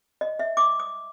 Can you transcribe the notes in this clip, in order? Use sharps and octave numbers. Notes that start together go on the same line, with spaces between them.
D#5
E5
D6
D#6